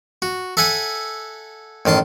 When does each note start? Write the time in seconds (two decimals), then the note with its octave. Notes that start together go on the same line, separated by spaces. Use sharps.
0.22 F#4
0.57 A4 E5 F#5 G#5
1.86 A1 D#3 A5 C6